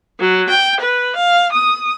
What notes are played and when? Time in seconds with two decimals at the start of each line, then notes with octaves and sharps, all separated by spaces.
0.19 F#3
0.49 G5
0.80 B4
1.15 F5
1.52 D#6